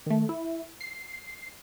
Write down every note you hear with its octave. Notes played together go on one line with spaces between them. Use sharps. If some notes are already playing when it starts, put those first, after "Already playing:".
D#3 A3
E4
C7